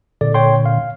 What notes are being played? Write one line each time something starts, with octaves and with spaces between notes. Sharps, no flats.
A#2 D3 D5
C#5 G5 C6
F5